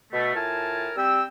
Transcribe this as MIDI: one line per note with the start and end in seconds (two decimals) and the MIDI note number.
0.12 0.34 47
0.12 0.34 57
0.35 0.90 45
0.35 0.90 65
0.35 0.90 70
0.35 0.90 80
0.35 0.90 81
0.96 1.23 55
0.96 1.23 60
0.96 1.23 79
0.96 1.23 88